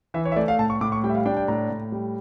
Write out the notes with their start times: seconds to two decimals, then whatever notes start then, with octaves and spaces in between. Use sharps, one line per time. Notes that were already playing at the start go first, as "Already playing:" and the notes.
0.14 E3 E5
0.25 C#5
0.32 E5
0.36 A3 D5
0.48 F5
0.59 A2 A5
0.70 C#6
0.81 A2 D6
0.92 C#6
1.04 G3 G5
1.10 E5
1.15 F5
1.26 D4 G5
1.37 G5
1.48 A2 A#5
1.70 A2
1.92 G3